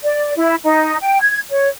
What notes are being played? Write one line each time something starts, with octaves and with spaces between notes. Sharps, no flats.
D5
E4
D#4
G5
G#6
C#5